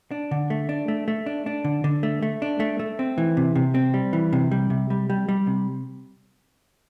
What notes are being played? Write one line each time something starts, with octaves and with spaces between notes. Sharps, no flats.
D4
D3
A3
D4
A3
A3
D4
D4
D3
D3
A3
A3
D4
A3
A3
C4
E3
C3
C3
C4
G3
E3
C3
G3
C3
G3
G3
G3
C3